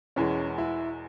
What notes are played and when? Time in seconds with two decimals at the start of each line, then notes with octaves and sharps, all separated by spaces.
0.16 E1 E2 E3 G#3 C#4
0.58 E4